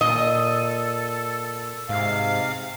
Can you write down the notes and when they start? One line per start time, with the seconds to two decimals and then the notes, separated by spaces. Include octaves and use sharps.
0.01 A#2 A4 D#5
1.89 G#2 C3 F5